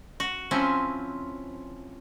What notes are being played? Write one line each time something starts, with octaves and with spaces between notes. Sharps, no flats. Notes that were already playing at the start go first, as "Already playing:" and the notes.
F#4
F3 C4 C#4 E4